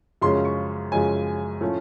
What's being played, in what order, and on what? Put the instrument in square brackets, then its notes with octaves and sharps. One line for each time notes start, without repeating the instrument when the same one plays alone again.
[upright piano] F#2 C#3 F3 G#3 C#4 C6
C#6
F#2 C#3 F3 G#3 C#4 G#5
A2 F3 A3 C#4